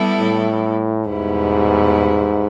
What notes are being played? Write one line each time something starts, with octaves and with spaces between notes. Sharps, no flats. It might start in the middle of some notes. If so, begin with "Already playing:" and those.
Already playing: G3 B3 E4 A4
A2
E2 G#2 B2 G3 B3 E4